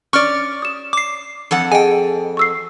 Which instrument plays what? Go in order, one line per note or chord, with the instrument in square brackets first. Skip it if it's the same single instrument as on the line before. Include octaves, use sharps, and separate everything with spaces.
[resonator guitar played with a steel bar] C#4 D5 [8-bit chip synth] C#6 F6
[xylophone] D#6 E7
[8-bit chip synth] D6 C7
[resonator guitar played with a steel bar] F2 A4 F#5
[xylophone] G#4 D#5 [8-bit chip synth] G5 G#5
[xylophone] C#6 E6 C7